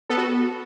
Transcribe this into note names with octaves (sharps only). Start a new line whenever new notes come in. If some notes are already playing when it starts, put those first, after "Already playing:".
B3 A4
F#4